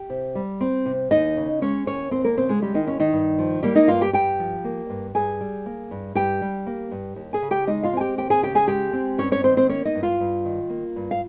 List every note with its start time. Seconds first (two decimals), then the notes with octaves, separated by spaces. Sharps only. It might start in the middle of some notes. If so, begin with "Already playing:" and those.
Already playing: G4 G5
0.10 C3
0.35 G3
0.61 C4
0.86 C3
1.11 D#2 D#4 D#5
1.37 C#3
1.61 G#3 C#4 C#5
1.86 D#2 C#4 C#5
2.11 D#2 C4 C5
2.24 A#3 A#4
2.37 C#3 C4 C5
2.49 G#3 G#4
2.62 G3 G#3 G4
2.74 D#3 D#4
2.87 D#2 C#4
3.00 D#3 D#4
3.12 G2
3.39 F3
3.63 G3 A#3 G4
3.75 D#4 D#5
3.88 G2 F4 F5
4.01 G4 G5
4.13 G2 G4 G5
4.40 F3
4.64 A#3
4.90 G2
5.15 G2 G#4 G#5
5.41 G3
5.66 A#3
5.91 G2
6.15 G2 G4 G5
6.42 G3
6.66 A#3
6.91 G2
7.16 D#2
7.33 G#4 G#5
7.42 C#3
7.51 G4 G5
7.67 G#3 D#4 D#5
7.83 F4 F5
7.93 C4 G#5
8.00 G4 G5
8.18 D#2 G4 G5
8.30 G#4 G#5
8.42 C#3 G4 G5
8.55 G#4 G#5
8.68 G#3 G4 G5
8.93 C4
9.18 G2 C#4 C#5
9.32 C#4 C#5
9.43 D#3 C4 C5
9.57 C4 C5
9.69 A#3 C#4 C#5
9.85 D#4 D#5
9.95 G2
10.03 F4 F5
10.20 G2
10.45 D#3
10.70 A#3
10.96 G2
11.11 F5